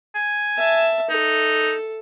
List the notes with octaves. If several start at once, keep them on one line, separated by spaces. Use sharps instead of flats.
G#5
E5 A5
D#4 A4